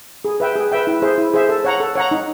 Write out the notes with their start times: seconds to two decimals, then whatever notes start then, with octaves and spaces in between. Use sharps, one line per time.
0.25 G#4
0.40 B4 E5 G5
0.55 G#4
0.72 B4 E5 G5
0.87 E4
1.02 G#4 C5 E5
1.18 E4
1.34 G#4 C5 E5
1.49 A4
1.65 C#5 F#5 A#5
1.80 A4
1.95 C#5 F#5 A#5
2.11 D#4